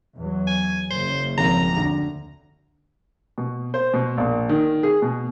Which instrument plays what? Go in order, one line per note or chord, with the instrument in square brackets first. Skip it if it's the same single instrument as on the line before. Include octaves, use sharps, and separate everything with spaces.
[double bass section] E2 F#3
[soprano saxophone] G#5
[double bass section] F#1 C#3 [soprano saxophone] C5
[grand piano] G#1 F2 [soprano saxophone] A#5
[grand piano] D2
[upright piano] B2
C5
B2
A#1
D#3
G#4
B2